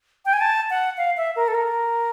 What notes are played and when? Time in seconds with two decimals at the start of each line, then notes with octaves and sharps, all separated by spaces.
0.25 G5
0.33 G#5
0.41 A5
0.70 F#5
0.98 F5
1.17 E5
1.36 A#4
1.48 A4
1.55 A#4